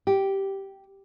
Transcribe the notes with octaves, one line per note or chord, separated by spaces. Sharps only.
G4